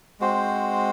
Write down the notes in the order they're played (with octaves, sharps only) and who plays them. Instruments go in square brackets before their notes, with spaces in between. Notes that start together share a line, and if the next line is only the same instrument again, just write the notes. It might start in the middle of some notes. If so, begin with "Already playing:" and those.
[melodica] G#3 C4 F#4 C5